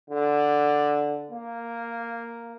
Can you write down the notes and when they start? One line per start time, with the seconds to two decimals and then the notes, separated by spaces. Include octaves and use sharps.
0.10 D3
1.31 A#3